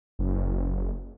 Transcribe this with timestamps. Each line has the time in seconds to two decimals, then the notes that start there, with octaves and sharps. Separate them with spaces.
0.19 F#1